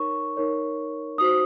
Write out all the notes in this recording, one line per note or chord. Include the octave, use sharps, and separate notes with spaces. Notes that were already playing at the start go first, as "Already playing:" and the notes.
Already playing: D#4 A#4 C#5 C#6
D#4 A#4 C#5
D#4 F#4 C5 D#6